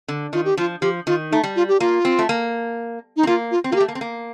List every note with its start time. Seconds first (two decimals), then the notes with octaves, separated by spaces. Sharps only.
0.08 D3
0.33 D#3 F4
0.45 G4
0.57 F3 F4
0.82 F3 G4
1.07 D#3 F4
1.31 A3 D#4
1.43 G3
1.56 F4
1.68 G4
1.80 A#3 F4
2.05 C4
2.19 A3
2.29 A#3
3.17 D#4
3.23 C4
3.27 A#3 F4
3.51 F4
3.64 C4
3.71 A#3 F4
3.76 G4
3.80 A3
3.88 A#3
3.95 C4
4.01 A#3